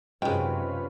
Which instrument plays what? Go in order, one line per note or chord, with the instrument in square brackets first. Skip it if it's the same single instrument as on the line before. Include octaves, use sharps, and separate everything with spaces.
[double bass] F#2 C3 [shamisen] D#3 G#3 [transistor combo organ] C#4 F4 B4 [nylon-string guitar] G5